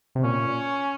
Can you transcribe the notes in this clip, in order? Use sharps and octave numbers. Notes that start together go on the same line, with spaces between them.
C3
A#2 C#4